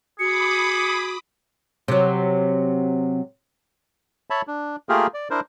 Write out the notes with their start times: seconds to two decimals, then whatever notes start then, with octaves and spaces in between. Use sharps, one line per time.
0.19 F#4 G#4 B5 D6 D#6 C#7
1.88 C3 F#3
4.30 C#5 E5 A5 B5
4.47 D4
4.89 A3 A#3 F4 G4 G#4 A#4
5.14 D5
5.30 D4 E4 A#4 C5